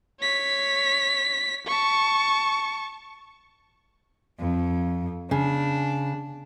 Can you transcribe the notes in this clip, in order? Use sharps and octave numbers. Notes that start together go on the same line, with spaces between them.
C#5 B6
A5 C#6
F2
C#3 D4